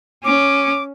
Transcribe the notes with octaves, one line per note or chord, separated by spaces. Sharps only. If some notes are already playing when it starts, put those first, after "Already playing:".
C#4 D6